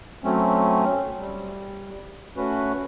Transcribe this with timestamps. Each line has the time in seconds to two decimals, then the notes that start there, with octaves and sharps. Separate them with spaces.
0.24 F#3 A3 C4 C#4
1.19 G3
2.37 A3 C#4 F#4 B4